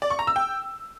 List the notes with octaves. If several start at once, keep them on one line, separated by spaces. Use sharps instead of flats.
D5
C#6
A#5
E6
G5